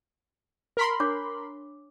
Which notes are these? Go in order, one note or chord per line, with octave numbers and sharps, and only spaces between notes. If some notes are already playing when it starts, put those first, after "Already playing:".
A#4 B5 C6
D4 C#5 D6